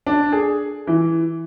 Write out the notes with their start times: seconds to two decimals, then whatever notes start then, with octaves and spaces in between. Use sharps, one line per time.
0.07 D4
0.32 G#4
0.87 E3